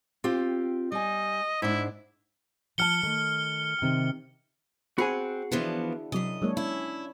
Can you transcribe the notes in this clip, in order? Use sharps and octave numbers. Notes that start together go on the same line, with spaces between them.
C4 F4 G4
G3 D#5 G#5
G#2 D4 E4
F3 G5 A5 F6 C#7 G7
D#3 A3
C3 D#3 C4
C4 F#4 G#4 F#5 G#5 B5
E3 F3 B3 D4 E4
F#2 C3 F#3 D#5
F#3 G#3 A#3 D4 C#5
C#4 E4